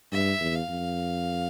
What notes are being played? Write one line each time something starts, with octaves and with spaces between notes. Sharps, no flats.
G2 E5
E2
F5
F2